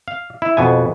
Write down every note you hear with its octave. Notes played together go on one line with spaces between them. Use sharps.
F5
E4
F2 B2 B3 G#5